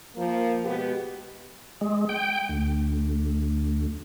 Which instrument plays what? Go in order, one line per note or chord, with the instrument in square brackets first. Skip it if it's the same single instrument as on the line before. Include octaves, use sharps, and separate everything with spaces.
[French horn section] F3 A#3
B2 G#3 B3 G4
[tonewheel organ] G#3
G5
D2